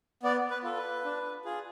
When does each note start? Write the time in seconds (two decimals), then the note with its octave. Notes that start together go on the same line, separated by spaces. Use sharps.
0.23 B3 D5
0.50 B4
0.63 F4 A4
0.77 B4
1.05 D4
1.45 F4 G#4